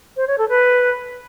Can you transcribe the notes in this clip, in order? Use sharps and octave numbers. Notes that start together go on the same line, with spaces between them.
C5
C#5
A4
B4